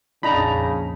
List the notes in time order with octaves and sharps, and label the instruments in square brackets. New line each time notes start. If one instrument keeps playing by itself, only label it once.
[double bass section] A#1 F2 [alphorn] C#3 [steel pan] D4 D#4 A#5 [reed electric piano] B5